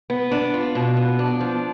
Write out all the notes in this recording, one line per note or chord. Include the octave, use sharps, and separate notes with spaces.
B3
D4
F4
B2
B3
D4
F3